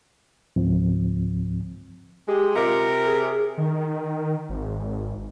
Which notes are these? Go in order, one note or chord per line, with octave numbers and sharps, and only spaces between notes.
C#2 G#2 F3 C4
G#3 G4
C3 F4 A#4
G#4
D#3
G#1